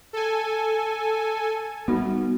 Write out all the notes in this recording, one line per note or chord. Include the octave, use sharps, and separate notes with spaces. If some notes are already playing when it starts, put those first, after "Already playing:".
A4 G#5
G3 B3 D#4 F#4